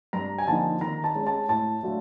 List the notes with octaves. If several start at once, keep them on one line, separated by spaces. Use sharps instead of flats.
G2 A#5
G#5
D3 F3 A#3 D#4 A5
D#3 A#5
A5
G#3 C#4
A5
A2 A5
F#3 A3 D4 F4